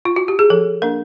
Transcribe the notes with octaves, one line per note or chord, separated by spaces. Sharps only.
F4
F#4
G4
G#4
F3 A4
A#3 D4 A#4